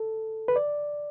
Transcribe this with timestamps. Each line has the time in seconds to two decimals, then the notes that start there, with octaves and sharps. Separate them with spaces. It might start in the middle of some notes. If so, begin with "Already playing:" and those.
Already playing: A4
0.48 B4
0.56 D5